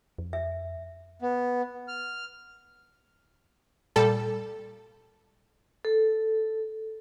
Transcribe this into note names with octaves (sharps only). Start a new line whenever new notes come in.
F2
E5
B3
F6
A#2 G3 A4 A5
A4